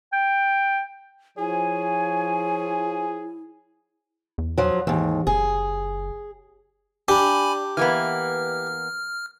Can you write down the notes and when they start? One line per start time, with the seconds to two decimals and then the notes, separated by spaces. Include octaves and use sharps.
0.13 G5
1.38 F3 E4 G#4 C#5 G#5
4.38 E2
4.58 F3 F#3
4.87 D#2 G#2 E3
5.27 F#1 G#4
7.08 D4 G4 G#5 B5
7.77 E3 A#3 B3 F6